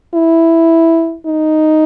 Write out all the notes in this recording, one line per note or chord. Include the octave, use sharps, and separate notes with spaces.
E4
D#4